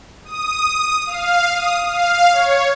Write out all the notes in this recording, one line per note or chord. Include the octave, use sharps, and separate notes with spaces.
D#6
F5
D#6
F5
C#5